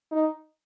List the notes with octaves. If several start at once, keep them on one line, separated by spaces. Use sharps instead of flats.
D#4